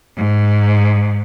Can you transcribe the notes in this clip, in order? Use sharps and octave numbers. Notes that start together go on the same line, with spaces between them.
G#2